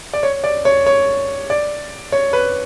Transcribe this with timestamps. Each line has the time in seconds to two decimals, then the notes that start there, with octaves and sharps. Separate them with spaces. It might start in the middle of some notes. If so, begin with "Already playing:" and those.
0.13 D5
0.23 C#5
0.44 D5
0.65 C#5
0.86 C#5
1.50 D5
2.12 C#5
2.33 B4